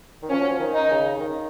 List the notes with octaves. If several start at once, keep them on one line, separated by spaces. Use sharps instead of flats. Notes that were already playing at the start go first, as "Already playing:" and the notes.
D#3
F3 C#4
F#3
F3
D#3
D#4
C#3
C#3
D#3